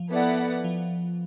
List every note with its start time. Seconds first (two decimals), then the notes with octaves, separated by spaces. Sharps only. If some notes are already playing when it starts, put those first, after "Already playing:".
Already playing: F3
0.11 B3 E4 A4 D5 F#5
0.64 F3